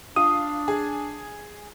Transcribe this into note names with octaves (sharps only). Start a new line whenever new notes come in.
D4 F4 D#6
G#4